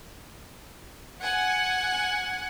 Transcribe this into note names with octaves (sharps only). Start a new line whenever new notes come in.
F#5 G#5